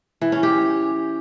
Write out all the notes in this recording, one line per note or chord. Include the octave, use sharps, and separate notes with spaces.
E3
C#4
G4